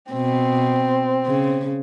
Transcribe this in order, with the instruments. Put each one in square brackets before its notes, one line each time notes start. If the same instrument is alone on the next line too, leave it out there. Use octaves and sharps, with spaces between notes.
[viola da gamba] B2 [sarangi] C4
[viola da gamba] C#3